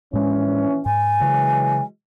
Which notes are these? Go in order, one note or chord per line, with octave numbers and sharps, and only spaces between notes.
A#1 A2 E3 G#3 C#4
G#2 G#5
C#3 E3 F#3 G#3